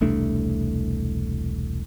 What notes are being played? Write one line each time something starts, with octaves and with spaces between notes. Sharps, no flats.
E1 C2 A3 D4